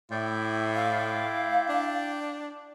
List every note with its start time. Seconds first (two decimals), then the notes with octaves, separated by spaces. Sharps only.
0.11 A2 E4 D5 G5
0.75 F5
1.69 D4